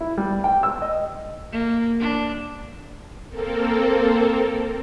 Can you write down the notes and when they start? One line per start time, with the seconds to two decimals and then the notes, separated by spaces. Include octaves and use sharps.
0.01 E4
0.17 G3
0.44 G5
0.63 E6
0.82 D#5
1.52 A#3
1.99 D4
3.30 A#3 C4 A4 A#4